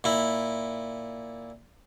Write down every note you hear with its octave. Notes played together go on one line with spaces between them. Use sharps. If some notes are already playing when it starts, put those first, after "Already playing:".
A#2 E4